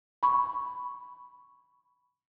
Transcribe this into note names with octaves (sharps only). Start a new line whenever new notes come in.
B5 C#6